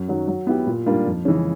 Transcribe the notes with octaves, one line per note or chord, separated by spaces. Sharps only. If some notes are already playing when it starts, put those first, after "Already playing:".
Already playing: F#2
D#3 F#3
F#3
B3 E4 G4
A#2
G3 A#3 D4 F4
F2
C#3 E3 G#3 C#4